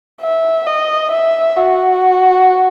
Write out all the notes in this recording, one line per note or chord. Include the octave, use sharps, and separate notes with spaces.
E5
D#5
E5
F#4